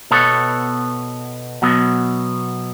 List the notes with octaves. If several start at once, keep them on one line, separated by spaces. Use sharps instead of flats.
B2 B3 A4 C#5
B2 F#3 B3